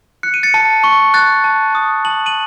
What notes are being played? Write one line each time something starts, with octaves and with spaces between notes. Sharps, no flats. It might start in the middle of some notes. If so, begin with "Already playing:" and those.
F#6 C#7
D#7
A6 C#7
A5
C#6
F#6 A6
A5
D#6
A5 F#7
D#7 F#7